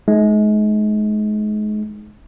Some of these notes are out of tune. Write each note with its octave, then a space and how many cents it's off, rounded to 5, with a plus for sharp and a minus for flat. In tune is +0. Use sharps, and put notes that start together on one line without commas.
G#3 +35 D#4 +0